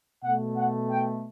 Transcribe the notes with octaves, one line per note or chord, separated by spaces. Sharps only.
B2 A3 F#5
F#5
G5